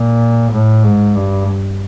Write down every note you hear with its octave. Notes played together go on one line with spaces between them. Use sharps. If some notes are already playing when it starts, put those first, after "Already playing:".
Already playing: A#2
A2
G#2
G2